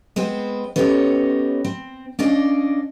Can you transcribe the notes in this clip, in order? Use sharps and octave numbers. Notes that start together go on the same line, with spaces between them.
G#3 B3 C4 C5
B3 C#4 D#4 G4 A4 C#5
C4
C#4 D4 D5 D#5 F5